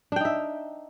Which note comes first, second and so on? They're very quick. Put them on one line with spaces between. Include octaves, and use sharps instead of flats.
D4 G5 D#4 E5